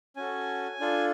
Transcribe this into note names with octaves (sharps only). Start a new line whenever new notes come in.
C#4 F#4 A4 G#5
D4 F4 A4